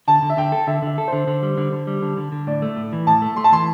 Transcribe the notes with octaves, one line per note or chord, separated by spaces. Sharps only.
D3 A5
D3
E5
D3 G5
A4
D3 E5
D3 E5
A4
C5
D3
D3
G3
D3
D3
G3
D3
D3
D3
A2 D5
A3
A2
E3
A2 A5
A3
A3 C6
A5
E3 C6